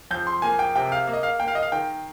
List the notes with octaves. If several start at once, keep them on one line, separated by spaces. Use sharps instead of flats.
F2 G6
C6
A#3 G#5
G5
C3 G5
F5
A#3
D#5
F5
A#3 G5
F5
D#5
F5
D#3 G5